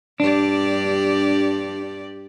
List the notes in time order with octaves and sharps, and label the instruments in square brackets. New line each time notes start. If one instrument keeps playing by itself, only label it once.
[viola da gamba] G2 G4 D5 [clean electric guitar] D4